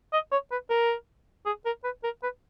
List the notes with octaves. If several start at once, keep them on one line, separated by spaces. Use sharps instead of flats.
D#5
C#5
B4
A#4
G#4
A#4
B4
A#4
B4